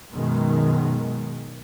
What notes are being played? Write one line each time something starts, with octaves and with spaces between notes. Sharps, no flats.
F#2 B2 D#3 G#3